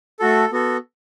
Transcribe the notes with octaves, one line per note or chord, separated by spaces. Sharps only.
A3 F#4 A4
B3 F#4 A4